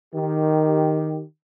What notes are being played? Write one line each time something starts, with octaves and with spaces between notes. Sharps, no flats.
D#3 G4